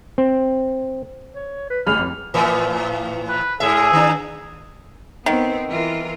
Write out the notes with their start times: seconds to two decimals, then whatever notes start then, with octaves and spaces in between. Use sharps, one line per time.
0.18 C4
1.34 C#5
1.70 B4
1.87 A1 G#4 B5 F6
1.99 F2
2.34 A2 E3 F3
3.29 B4
3.60 G#2 G#4 E5
3.93 D#3 D4
5.26 D#3 B3 C4
5.71 E3 F4 A#4